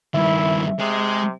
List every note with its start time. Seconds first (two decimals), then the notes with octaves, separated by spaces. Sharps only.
0.14 G2 D#3 E4 E5
0.80 C3 G#3